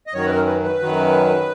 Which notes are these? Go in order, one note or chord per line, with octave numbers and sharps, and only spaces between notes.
D#5
F#2 D#3 F#3 C#5
B4
A#4
B4
B4
F#2 D#3 F#3